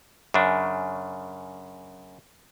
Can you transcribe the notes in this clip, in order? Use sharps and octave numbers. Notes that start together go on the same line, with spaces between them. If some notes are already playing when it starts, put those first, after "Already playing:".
F#2 C#3 D4